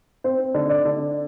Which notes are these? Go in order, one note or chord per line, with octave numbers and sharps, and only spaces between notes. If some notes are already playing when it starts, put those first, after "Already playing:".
C4 C5
D3
D5
D3